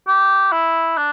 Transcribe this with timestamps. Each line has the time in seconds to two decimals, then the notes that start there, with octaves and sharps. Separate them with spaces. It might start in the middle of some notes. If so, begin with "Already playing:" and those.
0.07 G4
0.52 E4
0.97 D4